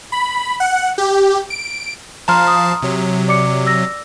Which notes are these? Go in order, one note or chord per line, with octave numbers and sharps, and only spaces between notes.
B5
F#5
G4
D7
F3 F5 A5 A#5 C6 F6
D#6
C3 F#3
D5 D6 C#7
E6 A#6